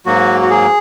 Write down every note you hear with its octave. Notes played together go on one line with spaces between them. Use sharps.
G#2 F#3 A#3 F#4
F#4
G#4